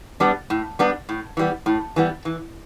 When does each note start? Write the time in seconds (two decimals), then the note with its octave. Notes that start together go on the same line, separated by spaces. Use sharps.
0.20 G3 B3 D4
0.50 A2
0.79 G3 B3 D4
1.09 A2
1.37 E3 G3 B3
1.66 A2
1.96 E3 G3 B3
2.25 E3